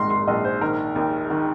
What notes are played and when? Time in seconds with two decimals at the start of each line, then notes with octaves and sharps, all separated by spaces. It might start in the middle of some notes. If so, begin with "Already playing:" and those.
Already playing: A#1 G#2 D#3 A#5 C6
0.10 C6
0.28 A#1 D#5
0.44 C5
0.61 D#3 A#4
0.96 D#2
1.30 D#3